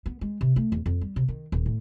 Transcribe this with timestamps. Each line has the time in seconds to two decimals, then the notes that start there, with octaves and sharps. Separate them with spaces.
0.06 B3
0.21 G#3
0.41 C3
0.56 A3
0.72 E2
0.86 F2
1.01 G3
1.16 C3
1.28 D#3
1.52 D#1
1.66 A2